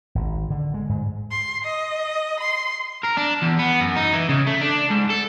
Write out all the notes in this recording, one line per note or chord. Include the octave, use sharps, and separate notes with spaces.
G#1
D3
G#3
G#2
C6
D#5
C6
A#4
D4
E2
B3
F#2
D#4
E3
C#3
A3
D4
G#2
A4